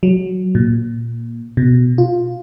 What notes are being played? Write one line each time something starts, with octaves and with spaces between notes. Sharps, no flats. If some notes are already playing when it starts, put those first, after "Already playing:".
F#3
A#2
B2
F4